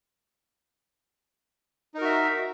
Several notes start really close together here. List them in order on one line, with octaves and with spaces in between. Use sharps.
D#4 A#4 F#4 E5